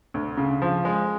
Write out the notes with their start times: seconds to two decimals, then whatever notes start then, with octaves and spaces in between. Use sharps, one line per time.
0.14 D2
0.37 C#3
0.62 F3
0.85 G#3